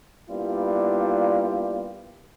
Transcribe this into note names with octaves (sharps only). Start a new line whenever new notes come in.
G3 A#3 B3 D4 E4 F4